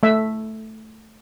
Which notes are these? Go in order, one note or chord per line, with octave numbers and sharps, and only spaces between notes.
A3 E5